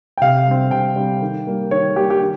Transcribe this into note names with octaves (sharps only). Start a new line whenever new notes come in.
G5
C3 F5
G3 C4
C3 G5
G3 C4
D#3
G3 A#3
D#3 C#5
G3 A#3 G4
G4
D#3